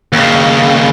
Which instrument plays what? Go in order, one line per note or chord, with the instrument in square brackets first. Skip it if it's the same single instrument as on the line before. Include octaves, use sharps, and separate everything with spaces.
[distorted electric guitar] D#2 C#3